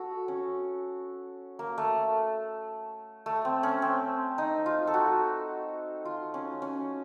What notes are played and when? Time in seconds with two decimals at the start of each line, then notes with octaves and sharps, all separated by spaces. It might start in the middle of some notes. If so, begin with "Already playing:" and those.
Already playing: F#4 A4
0.28 C#4
1.59 A#3
1.78 A3
3.26 A3
3.45 C4
3.63 C#4
3.82 C4
4.38 D#4
4.66 F4
4.87 A4
4.94 F#4
6.05 F4
6.34 C#4
6.62 C#4